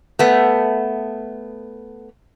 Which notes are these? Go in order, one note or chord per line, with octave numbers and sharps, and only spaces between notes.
A3 B3